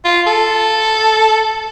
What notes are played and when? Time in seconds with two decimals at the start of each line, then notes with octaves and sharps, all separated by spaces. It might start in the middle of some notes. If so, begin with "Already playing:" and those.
0.05 F4
0.27 A4